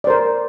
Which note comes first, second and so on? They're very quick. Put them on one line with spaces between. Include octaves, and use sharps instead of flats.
D5 C5 A#4